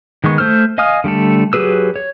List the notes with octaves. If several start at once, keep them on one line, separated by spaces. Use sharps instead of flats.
D#3 G#3 B3 C#6
A3 C5 E6 F6
D#5 F5 G#5 D#6 F6
D3 G3 A3 A4
F#3 G4 G#4 B4 E6
C#5